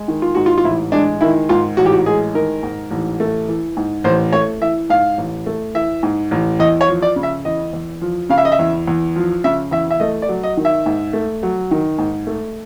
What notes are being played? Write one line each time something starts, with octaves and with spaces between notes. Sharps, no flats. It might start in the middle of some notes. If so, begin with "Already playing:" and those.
Already playing: G#3
D#3
F4
G#2 F#4
F4
F4
A1 E4
G#3 D4
D#3 E4
G#2 F4
A1 F#4
G4
F#4
G#3 G#4
D#3 A#4
G#2
A1
A3
E3
G#2
A1 C5
A3 C#5
E3 E5
G#2 F5
A1
A3
E3 E5
G#2
A1
E2 D#5
C#5
F3
D5
C#3
E5
E2 D#5
E2
F3
C#3 F5
E5
D#5
E5
E2
E2
F3
C#3 E5
E2 E5
E5
A3 D#5
D5
F#3
D#5
D#3
E5
G#2
A3
F#3
D#3
G#2
A3